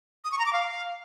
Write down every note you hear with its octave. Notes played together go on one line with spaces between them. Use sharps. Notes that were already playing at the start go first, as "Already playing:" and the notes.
D#6
C#6
A#5
D6
F5